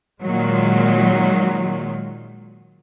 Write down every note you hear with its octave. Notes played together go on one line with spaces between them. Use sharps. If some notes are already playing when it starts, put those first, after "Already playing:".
A#2 D#3 F#3 G#3